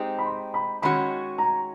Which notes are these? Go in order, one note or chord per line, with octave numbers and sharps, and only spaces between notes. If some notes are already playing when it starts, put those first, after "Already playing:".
Already playing: G#3 C4 D#4 G4
B5
C6
B5
D#3 G#3 C#4 F#4 B5
A#5